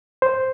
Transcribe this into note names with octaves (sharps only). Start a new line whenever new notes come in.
C5